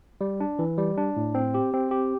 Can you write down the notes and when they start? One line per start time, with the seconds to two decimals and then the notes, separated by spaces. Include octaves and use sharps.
0.21 G3
0.40 D4
0.59 E3
0.78 G3
0.97 D4
1.16 A2
1.35 C4
1.54 G4
1.73 C4
1.91 G4